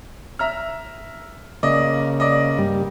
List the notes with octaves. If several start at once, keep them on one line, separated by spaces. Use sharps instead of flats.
E5 A#5 F6
C#3 A#3 D5 D#5
D5 D#5
G2 G3 A#3